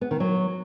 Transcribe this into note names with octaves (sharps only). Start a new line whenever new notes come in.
B3
D#3
F#3